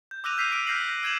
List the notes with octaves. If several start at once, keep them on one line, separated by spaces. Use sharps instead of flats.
G6
D6 E6 F#6 A#6 D#7 F7
F6 G6 B6 C7 D#7 F7
D6 D7 D#7 F7
F6 G6 A#6 C7 F#7
E6 G6 G#6 D7 E7 F#7